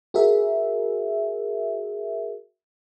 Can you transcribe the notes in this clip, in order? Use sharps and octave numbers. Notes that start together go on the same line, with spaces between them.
F#4 G#4 A#4 E5